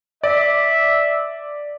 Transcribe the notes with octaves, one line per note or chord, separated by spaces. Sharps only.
D5 E5